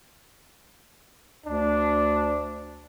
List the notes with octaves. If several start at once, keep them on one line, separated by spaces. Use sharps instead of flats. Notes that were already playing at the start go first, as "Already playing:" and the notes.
D2 D4